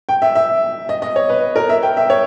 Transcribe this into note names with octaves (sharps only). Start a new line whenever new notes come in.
G5
E5
E5
D#5
D#5
C#5
B4
A#4
E5
G5
E5
C#5